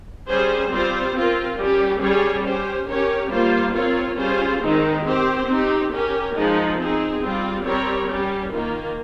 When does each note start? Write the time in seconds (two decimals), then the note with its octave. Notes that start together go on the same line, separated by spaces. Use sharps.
0.26 G3 C#4 G#4 C5
0.71 G3 C4 F4 C5
1.14 C4 F4 A#4
1.57 G3 C#4 G4
2.01 G3 C#4 G#4 C#5
2.44 C#4 G4 C5
2.87 C#4 G4 A#4 C#5
3.30 G3 A#3 F4 C5
3.74 C4 F4 A#4 C#5
4.17 G3 C#4 F4 G#4 C5
4.61 D#3 G#3 C4 D#4
5.05 C4 G4 C5
5.47 C4 D#4 G4
5.92 C#4 G4 A#4
6.35 F3 G#3 D#4
6.78 C4 D#4 G#4
7.22 G3 C4 F4
7.65 G3 C4 G4 A#4 C#5
8.09 G3 C#4 G4
8.52 D#3 A#3 F4 A#4